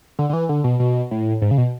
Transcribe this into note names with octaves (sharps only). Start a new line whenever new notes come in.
D3
D3
E3
D3
B2
B2
A2
G#2
C#3
B2